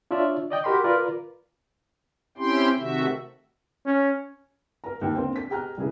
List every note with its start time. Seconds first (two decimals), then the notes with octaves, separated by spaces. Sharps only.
0.11 D4 F4 C#5 D5 E5
0.50 D5 D#5 G5
0.64 F#4 G4 A#4 B5 C6
0.84 F4 A#4 B4 D5
2.38 C4 C#4 E4 G4 G5 C6
2.78 C3 D#3 A3 F#4 E5
3.85 C#4
4.84 A#4 A#5
5.01 D#2 G5
5.15 D3 A#3 C4 G5
5.36 B6
5.50 G4 G#4 G5 A#5 F6 F#6
5.77 E1 C#3 E4 G#4 A#4